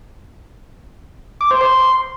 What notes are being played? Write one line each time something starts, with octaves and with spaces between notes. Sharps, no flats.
D6
C5
C6